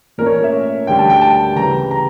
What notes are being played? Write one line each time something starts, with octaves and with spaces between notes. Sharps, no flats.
A#2 A3 C#4 A#4
C#5
E5
D2 D3 G3 G5
A5
G5
A5
C#3 E3 G3 A#5
A#5